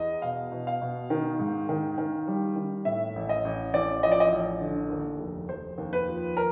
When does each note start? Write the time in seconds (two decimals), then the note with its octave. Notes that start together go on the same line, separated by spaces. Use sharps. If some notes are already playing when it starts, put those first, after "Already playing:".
Already playing: E2 D#5
0.22 B2 F5
0.52 B2
0.67 F5
0.81 B2
1.10 D#3
1.39 G#2
1.69 D#3
1.98 D#3
2.28 G3
2.56 D#3
2.85 A2 E5
3.16 A1
3.29 D#5
3.45 A1
3.74 A1 D5
4.03 F3 D#5
4.12 D5
4.20 D#5
4.32 A1
4.61 D3
4.90 D#2
5.20 F1
5.49 F1 C5
5.78 D#2
5.93 B4
6.08 F3
6.37 A#4